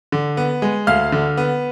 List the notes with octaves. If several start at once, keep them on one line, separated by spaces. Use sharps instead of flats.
D3
B3
G#3
D2 F5 F6
D3
B3